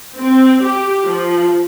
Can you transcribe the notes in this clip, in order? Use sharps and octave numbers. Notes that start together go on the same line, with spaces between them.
C4
G4
F3